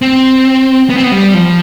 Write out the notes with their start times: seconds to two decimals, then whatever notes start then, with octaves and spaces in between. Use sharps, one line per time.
0.02 C4
0.90 B3
0.97 C4
1.04 B3
1.12 G3
1.34 F3